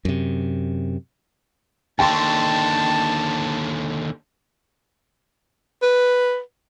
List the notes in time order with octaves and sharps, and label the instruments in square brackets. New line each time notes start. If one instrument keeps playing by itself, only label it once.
[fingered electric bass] F#2 C3
[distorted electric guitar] D#2 D3 [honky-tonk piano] G5 C6 C#6 [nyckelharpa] A5
[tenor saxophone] B4